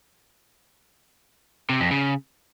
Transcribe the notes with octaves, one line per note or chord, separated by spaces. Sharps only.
C3
F2
C#3